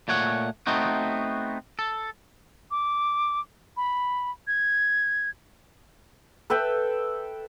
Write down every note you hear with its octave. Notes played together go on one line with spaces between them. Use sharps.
A#2 A3 C#5 F#5
A3 B3 C4 D#4 F#4
A4
D6
B5
G#6
A4 B4 E5 G5